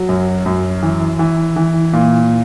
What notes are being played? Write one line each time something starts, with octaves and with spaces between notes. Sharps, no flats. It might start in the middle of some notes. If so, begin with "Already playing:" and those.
Already playing: F#3
F#2
F#2
E3
E3
E3
A#2